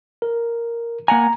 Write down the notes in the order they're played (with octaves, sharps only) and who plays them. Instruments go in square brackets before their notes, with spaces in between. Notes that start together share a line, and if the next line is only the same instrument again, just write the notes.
[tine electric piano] A#4
[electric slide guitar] A#3 F#5 G#5 [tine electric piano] A#5